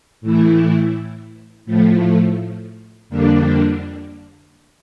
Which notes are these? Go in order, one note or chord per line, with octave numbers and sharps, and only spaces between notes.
A2 E3 A3 E4
A2 F3 A3
F2 D3 G3 A#3 D4